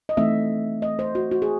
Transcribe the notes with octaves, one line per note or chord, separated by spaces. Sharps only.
D#5
E3 A3 C4 D#4 E5
D#5
C5
F#4
F#4
G#4